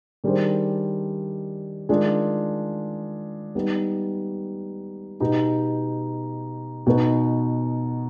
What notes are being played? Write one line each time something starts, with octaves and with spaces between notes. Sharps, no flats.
D#3 G3 D4 G#4 C5
D#3 G#3 D4 F4 G#4
G3 B3 D#4
B2 B3 D#4 G4
B2 B3 D#4 B4